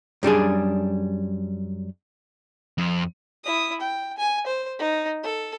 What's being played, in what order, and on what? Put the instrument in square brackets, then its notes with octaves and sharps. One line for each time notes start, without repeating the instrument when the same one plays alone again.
[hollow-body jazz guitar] F#2 G3 D4 G#4
[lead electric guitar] F2
[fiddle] E4 D#6
G5
G#5
C5
D#4
A4